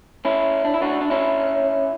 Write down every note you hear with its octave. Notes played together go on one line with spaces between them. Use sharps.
C#4 E4
D4
E4
D4 F#4
D4
C#4 E4